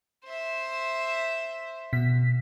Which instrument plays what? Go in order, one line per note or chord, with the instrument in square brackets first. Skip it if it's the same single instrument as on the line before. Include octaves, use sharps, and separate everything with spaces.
[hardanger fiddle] C5 E5
[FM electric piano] B2 B6